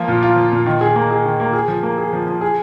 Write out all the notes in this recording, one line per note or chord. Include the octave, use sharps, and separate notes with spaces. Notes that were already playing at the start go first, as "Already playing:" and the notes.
Already playing: F3 A#3 F4
A#2
F4
F3
A#2
D#3
G#4
A#3
G#4
D#3
A#3
G#4
F3
A#3
G#4
F3
F3
G#4